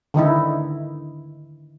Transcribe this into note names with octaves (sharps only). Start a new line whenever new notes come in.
D3 D#3 D#4 E4